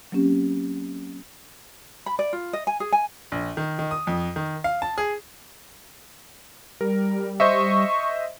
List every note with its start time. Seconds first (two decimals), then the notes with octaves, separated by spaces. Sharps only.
0.12 F#3 A#3 C4 C#4 G4
2.06 B5
2.19 D5
2.33 F4
2.53 D#5
2.67 G#5
2.80 G#4
2.93 G#5
3.32 A#1
3.57 D#3
3.79 D#3
3.91 D#6
4.07 F2
4.36 D#3
4.64 F5
4.82 A5
4.98 G#4
6.81 G3 A#4
7.40 C5 D#5 E5 C#6